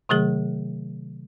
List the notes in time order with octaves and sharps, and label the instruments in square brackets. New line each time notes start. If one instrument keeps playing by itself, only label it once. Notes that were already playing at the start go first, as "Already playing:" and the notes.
[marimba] C3 D#3 F#3 A3 G#4